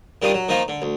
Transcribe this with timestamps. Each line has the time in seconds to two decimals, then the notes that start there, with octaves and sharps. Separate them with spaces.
0.22 D#3 G3 D4 F4 D#6
0.34 F#3
0.48 D#3 F3 A#3 D#4 F4
0.68 D3
0.82 D2